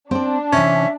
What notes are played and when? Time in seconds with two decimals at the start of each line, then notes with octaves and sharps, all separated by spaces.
0.11 C4 D4 D5
0.52 C3 E3 C#4 E5